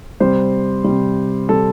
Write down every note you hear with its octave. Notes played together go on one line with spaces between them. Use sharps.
C3 G3 C5
C3 G3
C3 G3 A4